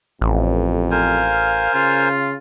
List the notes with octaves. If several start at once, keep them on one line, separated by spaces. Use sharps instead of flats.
A1 F2
A#4 C5 F5 G#5
C#3 F4